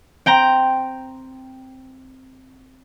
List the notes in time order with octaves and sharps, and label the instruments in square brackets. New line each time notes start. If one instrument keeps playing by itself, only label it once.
[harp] C4 G5 A#5